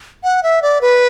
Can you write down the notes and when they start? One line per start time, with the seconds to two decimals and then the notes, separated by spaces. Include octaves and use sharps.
0.24 F#5
0.43 E5
0.62 D5
0.81 B4